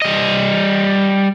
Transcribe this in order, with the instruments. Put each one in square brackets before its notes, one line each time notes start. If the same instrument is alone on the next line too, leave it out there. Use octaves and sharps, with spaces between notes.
[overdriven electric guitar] G3 D#5